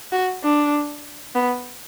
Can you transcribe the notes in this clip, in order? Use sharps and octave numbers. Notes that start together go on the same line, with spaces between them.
F#4
D4
B3